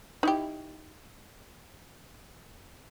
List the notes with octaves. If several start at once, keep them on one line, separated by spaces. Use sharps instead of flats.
D#4 E4 G4